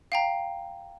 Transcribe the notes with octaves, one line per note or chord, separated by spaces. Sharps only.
F5 G5 A#5